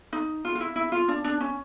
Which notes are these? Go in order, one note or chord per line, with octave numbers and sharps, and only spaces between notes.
D#4
F4
F4
E4
E4
F4
D4
D4
C#4